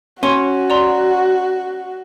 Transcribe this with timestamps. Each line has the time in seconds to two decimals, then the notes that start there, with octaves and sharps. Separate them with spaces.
0.23 C#4 F#4 C6
0.70 D5 A#5 C6